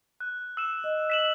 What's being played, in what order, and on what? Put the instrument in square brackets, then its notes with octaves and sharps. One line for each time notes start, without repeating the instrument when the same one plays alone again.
[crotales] F#6
E6 E7
[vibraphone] D#5
[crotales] B6 E7 F#7